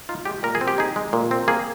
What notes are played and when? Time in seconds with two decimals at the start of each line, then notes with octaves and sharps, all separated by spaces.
0.09 D#4 F4
0.25 G#3 G4
0.43 A#2 A#4
0.55 G#4
0.61 C4
0.68 G4
0.78 D#4 G#4
0.96 G#3
1.13 A#2
1.31 C4
1.48 A#3 G#4